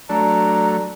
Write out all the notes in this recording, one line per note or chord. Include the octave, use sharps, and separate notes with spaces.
F#3 A3 D4 A#5